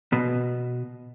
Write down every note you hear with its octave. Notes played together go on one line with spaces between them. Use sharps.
B2